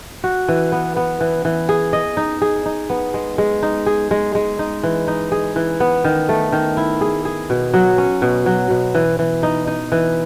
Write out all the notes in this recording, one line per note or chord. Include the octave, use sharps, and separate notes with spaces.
F#4
E3
B3
B3
E3
E3
G#4
D#5
D#4
G#4
D#4
B3
G#3
G#3
D#4
G#4
G#3
G#3
D#4
E3
D#4
G#4
E3
B3
D#3
A3
D#3
E4
G#4
G#4
B2
F#3
C#4
B2
F#3
B2
E3
E3
D#4
D#4
E3